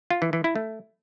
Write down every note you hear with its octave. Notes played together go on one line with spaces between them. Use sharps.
F4
E3
E3
E4
A3